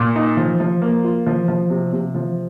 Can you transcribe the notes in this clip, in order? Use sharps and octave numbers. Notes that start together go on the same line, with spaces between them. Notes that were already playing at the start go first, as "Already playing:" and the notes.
Already playing: A#2
D#4
F3
F3
A#3
F4
F3
F3
C3
C3
F3